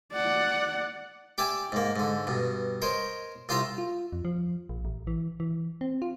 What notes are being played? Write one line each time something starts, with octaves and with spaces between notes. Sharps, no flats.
D5 F#5
G4 D5 E5 G5 G#5
G#2 A#3
G#2 D3
G2 B2
A#4 C5 C#5 D#5
C2 F4 C5 E5 F5 A#5
F4
F2
F3
A#1
A1
E3
E3
C4
F4